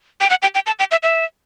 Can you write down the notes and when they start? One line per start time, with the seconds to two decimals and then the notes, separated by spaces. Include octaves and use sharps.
0.21 G5
0.30 F#5
0.42 G5
0.55 G5
0.66 A5
0.79 G5
0.91 E5
1.03 E5